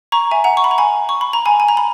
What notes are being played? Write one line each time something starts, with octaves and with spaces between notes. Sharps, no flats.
A#5 C#6
E5 G#5
F#5 A#5
C#6
B5
A#5
G#5 B5
C#6
B5
A#5
G#5 B5
G#5
A#5
B5